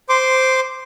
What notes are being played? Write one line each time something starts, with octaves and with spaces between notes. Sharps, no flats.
C5 C6 D6